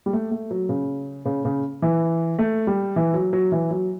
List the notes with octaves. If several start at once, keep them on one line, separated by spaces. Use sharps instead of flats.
G3
A3
A3
F#3
C#3
C#3
C#3
E3
A3
G3
E3
F#3
F#3
E3
F#3